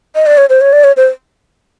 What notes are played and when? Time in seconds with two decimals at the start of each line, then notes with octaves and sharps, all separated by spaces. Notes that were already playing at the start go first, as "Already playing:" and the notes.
0.15 D#5
0.26 D5
0.38 C#5
0.49 C5
0.61 C#5
0.73 D5
0.84 C#5
0.97 C5